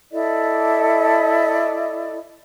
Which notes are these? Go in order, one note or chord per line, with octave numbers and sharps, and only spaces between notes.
E4 A4 D5 D#5